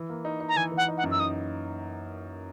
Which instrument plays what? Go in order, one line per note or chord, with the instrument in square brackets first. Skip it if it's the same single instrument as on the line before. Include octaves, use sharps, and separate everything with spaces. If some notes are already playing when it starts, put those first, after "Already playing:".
Already playing: [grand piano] E3
A#3
D#4
D#4
[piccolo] A#5
[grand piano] E3 [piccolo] G#5
[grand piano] E3
[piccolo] F#5
[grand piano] D#4
[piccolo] F#5
[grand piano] F#2
[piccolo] E6
[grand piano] D#4 [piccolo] D#6